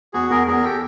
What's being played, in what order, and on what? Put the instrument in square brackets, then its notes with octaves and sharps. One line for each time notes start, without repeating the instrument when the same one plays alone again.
[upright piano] E2 [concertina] F#4 G#4
[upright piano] E2 [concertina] G#4 A#4
[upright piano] E2 [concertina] G#4 A#4
[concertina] G4 A4